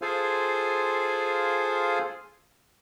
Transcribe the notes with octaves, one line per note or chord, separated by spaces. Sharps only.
F4 G#4 A4 C5 F5 G#5